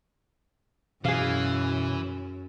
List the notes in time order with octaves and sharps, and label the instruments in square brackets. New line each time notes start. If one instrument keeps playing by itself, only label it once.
[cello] F#2 [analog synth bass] B2 [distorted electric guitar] E3 [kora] G#4 F5